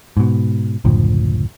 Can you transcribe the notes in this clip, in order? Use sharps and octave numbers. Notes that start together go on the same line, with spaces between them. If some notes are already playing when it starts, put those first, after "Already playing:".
G#2 B2
F#1 D2 A2 F3